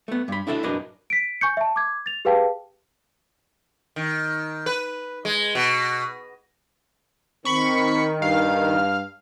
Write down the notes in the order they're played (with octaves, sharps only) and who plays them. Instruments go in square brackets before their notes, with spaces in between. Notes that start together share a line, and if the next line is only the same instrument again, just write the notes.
[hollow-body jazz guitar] A3 B3
G2 B5
D4 E4 F#4 A4 E5
F#2 A2 D4 A#4 B4 D#5
[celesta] B6 D7
G#5 C#6 G6 C#7
E5 A5
D6 G#6
A6 F7
G4 G#4 B4 F5 G5 A5
[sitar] D#3
B4
G#3
B2
[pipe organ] D#3 [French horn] C4 [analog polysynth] B5 C#6
[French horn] G2 [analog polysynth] F5